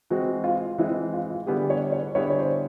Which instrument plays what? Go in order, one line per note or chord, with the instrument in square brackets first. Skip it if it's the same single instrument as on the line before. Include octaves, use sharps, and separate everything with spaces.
[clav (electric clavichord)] E3 G#3 C4 [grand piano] F#4
[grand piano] F4
[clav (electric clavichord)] E3 G#3 C4 [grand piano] E4
[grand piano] F4
F4
[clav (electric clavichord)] D3 G3 B3 E4 G#4 [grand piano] G4
[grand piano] C#5
C#5
[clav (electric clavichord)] D3 G3 B3 E4 G#4 [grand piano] C#5
[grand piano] C#5
C5